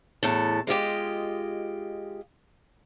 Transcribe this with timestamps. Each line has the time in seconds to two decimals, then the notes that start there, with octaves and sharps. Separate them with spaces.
0.23 E2 A2 A5
0.67 G#3 F4 G4 D#5